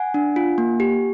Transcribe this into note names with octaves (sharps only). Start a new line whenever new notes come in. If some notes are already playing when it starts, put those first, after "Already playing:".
Already playing: F#5 G#5
D4
F4
A#3
G4